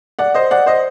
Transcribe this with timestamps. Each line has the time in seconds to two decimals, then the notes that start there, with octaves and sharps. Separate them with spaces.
0.19 D5 F#5
0.34 C5 D#5
0.51 D5 F#5
0.66 C5 D#5